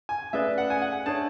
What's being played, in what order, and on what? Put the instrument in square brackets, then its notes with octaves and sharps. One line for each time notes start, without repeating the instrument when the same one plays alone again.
[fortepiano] G#5
[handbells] A3 C#4 G#4 B4 D5 [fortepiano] E5
[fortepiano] F#5
G#5
F#5
[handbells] D4 G#4 C#5 E5 [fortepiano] A5